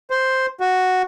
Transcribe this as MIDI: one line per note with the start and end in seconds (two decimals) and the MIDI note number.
0.10 0.46 72
0.60 1.03 66